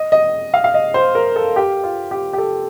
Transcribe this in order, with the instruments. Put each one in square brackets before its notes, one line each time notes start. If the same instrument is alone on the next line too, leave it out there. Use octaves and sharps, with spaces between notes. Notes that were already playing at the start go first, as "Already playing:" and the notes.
Already playing: [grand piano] D#5
D#5
F5
F5
D#5
C5
A#4
A4
G4
F4
G4
G4
A4